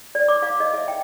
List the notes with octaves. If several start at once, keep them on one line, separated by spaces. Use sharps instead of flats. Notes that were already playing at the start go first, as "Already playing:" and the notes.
D5
D6
F5
D#5
E5
G5